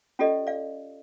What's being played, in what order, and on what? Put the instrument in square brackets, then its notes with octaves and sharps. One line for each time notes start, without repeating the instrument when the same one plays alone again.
[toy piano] C#4 F4 G4 A4 D5 D#5
D5 F5